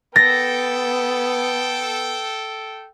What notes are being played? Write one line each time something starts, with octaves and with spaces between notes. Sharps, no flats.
B3 A4 G5 A6 A#6